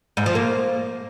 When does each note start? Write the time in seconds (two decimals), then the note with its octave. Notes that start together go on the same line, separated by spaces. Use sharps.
0.17 G#2
0.26 F3
0.35 A#3